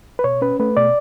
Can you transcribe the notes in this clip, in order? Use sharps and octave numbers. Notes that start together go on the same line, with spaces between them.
B4
B2 C#5
C#4 B4
A3 B4
B2 D5